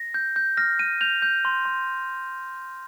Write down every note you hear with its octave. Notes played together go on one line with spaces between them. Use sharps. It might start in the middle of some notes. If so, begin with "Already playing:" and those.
Already playing: A#6
G6
G6
F6 A#6
F6 D#7
G6 F7
G6
C6
C6